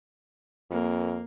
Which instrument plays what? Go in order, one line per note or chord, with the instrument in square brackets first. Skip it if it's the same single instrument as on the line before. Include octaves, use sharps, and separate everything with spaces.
[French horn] F2 [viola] A#3